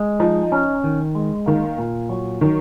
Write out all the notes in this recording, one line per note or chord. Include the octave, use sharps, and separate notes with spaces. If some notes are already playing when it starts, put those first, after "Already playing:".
Already playing: G#3
F3 D#4
C#4
D#3
G#3
D#3 A#3
A#2
F#3
D#3 F#3